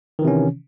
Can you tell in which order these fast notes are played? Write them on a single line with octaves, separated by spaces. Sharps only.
D#3 E3 C3 C#4